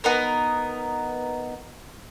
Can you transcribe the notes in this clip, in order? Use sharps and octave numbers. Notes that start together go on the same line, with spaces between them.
B3 D#4 A#4